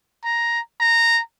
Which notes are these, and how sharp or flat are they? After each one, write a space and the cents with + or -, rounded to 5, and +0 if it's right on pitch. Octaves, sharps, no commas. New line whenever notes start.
A#5 +5
A#5 -10